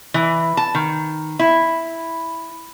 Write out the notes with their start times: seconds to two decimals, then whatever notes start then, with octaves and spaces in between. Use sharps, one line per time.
0.14 E3
0.57 A5
0.75 D#3
1.39 E4